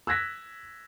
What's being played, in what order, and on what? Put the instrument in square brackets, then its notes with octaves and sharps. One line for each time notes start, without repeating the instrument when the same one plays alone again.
[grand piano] E6 F#6 G#6 A#6 B6